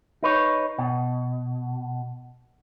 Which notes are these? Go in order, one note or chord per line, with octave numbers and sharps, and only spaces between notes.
D#4 B4 C#5
B2